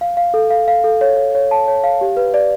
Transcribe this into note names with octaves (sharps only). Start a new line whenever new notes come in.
F5
F5
A4
F5
F5
A4
C#5
C#5
C#5
A5
C#5
F5
G4
B4
D5